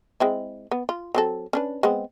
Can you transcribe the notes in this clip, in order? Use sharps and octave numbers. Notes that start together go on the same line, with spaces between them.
G#3 C4 E4
B3
F4
F#3 C4 A4
C#4 D4 B4
G#3 B3 C4